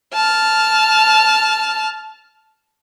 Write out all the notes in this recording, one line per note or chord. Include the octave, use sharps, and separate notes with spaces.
A5 F6